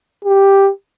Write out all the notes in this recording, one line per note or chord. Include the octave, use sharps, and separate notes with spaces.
G4